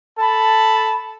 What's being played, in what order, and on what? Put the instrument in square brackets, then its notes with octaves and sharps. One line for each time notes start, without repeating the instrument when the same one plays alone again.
[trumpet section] A4 A5 B5